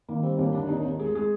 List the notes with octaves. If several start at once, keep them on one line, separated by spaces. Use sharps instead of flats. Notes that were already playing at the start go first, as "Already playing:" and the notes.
D#3 A#3
G3 C4
D#2 A#3
D3 D4
D#2 D#4
D#2
G#3 G#4
G#3 G#4